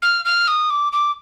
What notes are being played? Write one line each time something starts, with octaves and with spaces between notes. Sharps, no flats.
F6
F6
D#6
D6
D6